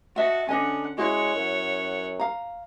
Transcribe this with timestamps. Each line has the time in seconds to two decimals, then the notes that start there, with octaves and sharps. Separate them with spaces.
0.16 F#4 D#5 E5 F#5 A5
0.49 D3 C#4 D4 D#5 F#5 G#5
0.98 G#3 E4 F#4 C#5 F#5
1.36 F#2
2.19 F5 A#5